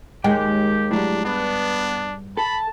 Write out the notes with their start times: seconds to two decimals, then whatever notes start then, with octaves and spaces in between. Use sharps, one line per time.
0.24 D#2 G#3 G4 G#4 G5
0.91 A2 F#3 G3 D4
1.25 G2 B3 D4
2.37 A4 A5 B5